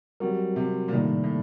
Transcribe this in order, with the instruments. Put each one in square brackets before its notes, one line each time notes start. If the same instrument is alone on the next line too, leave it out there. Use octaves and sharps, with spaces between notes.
[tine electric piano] F#3 C4 F#4 A#4 [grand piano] G3
[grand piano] C3
A#2
[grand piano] A2 [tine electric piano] C3 D#3 G3 A#3 D#4
[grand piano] A2